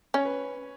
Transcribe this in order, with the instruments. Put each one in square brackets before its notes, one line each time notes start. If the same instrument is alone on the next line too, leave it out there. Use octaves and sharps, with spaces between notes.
[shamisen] C#4 [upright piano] C#5
[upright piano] B4